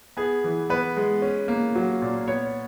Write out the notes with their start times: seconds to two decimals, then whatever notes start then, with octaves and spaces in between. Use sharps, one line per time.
0.17 B3 G#4
0.44 E3
0.70 B3 B4
0.97 G#3
1.22 C#4
1.48 A#3
1.75 F#3
2.02 A#2
2.28 B3 C#5